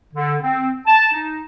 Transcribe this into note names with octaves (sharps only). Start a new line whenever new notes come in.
D3
C4
A5
D#4